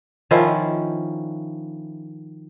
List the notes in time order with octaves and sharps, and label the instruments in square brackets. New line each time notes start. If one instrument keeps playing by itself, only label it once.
[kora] D#3 F3 C#4 E4